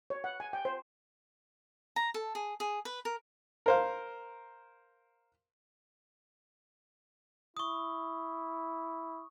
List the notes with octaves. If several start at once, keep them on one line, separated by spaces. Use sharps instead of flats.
C#5
F#5
G#5
G5
C5
A#5
A4
G#4
G#4
B4
A#4
A#4 C5 F5
E4 C#6 D#6